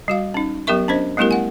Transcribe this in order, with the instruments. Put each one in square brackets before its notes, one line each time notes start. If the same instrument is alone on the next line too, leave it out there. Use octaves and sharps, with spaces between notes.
[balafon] G3 F#4 F5
C#4 D#4
F#3 B3 G4 A#4 E5 C#6
C#4 D4 C5 D#5
G3 A3 B3 E4 G4 A#4
F#5 G#5